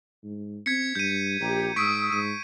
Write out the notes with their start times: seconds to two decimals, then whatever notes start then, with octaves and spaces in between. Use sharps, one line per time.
0.24 G#2
0.66 C4 G#6 B6 C#7
0.95 G2 G6 D#7
1.40 A#1 G4 A#5
1.76 G#2 C#6 D#6 E6 B6 D7
2.12 G#2 D#7